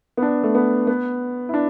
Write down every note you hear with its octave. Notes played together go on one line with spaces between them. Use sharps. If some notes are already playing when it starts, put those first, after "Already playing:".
B3
D4
A3
B3
B3
E4
D4